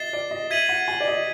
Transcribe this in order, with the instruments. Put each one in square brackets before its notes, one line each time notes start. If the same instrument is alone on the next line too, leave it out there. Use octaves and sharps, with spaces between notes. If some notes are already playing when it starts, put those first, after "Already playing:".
Already playing: [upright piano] D#5 E5 [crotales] A6 C7 E7 G7
[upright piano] D5
D#5
[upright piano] E5 [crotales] G#6 B6 D#7 F#7
[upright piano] F#5
G#5
D5
D#5